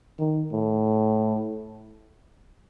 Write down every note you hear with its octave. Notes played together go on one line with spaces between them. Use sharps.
D#3
A2